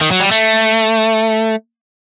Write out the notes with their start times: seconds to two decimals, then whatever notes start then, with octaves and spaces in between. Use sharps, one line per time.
0.01 D#3
0.11 F#3
0.20 G3
0.31 A3